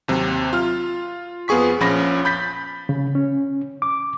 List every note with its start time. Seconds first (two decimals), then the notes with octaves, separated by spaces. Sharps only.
0.08 D#2 C3 F#3
0.53 F4 F6
1.48 F2 B3 F4 G#4 C#6 B6
1.80 A#1 A#2 F3 C#4 B5 A#6
2.25 B5 G6 A6 B6
2.89 C#3
3.15 C#4
3.82 D6